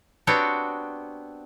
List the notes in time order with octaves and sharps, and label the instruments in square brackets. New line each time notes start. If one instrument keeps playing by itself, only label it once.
[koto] B3 C4 D4 F#4 G4 C#5